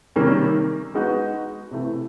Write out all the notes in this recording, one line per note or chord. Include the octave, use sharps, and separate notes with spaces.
C3 D#3 G3 A#3 C#4
G#3 B3 D#4 F#4
C3 E3 A3